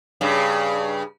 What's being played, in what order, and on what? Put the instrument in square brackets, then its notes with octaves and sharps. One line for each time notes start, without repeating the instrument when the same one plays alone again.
[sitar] G2 C#3